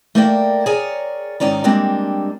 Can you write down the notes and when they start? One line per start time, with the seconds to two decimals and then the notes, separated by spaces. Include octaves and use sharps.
0.15 A3 A#3 A#4 C5 D5 G5
0.66 G#4 A#4 C#5 D5 G#5
1.40 G#2 D#3 C#4 D5 A#5
1.64 G3 G#3 A#3 C4 D4